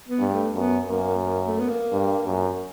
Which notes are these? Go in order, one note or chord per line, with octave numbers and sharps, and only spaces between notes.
B3
G2
A3
F#2 B3
F#2 A#3
A#3
A3
B3
A#3
G2
F#2